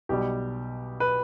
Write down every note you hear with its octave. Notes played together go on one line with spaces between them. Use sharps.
B1 B2 G3 G4
B4